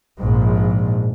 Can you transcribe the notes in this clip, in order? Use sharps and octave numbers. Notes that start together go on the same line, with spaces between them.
A#1 G#2